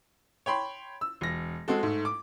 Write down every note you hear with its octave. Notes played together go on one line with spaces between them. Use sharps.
C#5 G5 B5 C6
E6
E1 A#6
G#3 C4 F#4 A4
G#2 A3
D6